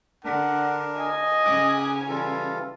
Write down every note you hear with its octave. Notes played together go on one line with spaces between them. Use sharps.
D3 D4 A#4 F#5
D#5 G#5
C#3 C#4 D6 D#6 F#6
E3 G3 F4 A4